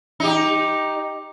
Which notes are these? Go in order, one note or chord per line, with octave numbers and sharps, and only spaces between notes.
D#4 G4